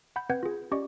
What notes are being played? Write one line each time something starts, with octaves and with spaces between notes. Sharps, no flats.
F#5 B5 G6
C4 B4 F#5 G6 G#6
F4 G#4
C#4 G4 D5 D#5 C#6 D6